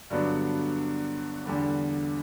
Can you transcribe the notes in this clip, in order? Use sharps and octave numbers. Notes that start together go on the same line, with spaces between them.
G2 D3 F#3 B3 D4
E2 D3 G3